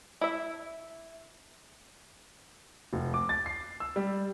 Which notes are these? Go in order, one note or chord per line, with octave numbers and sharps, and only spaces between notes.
E4 E5
F1
D6
A6
C7
E6
G3